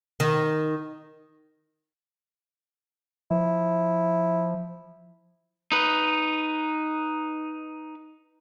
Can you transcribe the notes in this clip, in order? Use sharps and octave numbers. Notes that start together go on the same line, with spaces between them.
D#3
F3 E4
D#4 B4